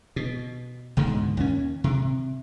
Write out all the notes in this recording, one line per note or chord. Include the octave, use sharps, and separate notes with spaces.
B2
C#2 G#2 B2 D3
D#2 C#4
C3